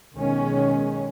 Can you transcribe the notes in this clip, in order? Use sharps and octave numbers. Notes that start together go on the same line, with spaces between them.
B1 D#3 G#3 C#4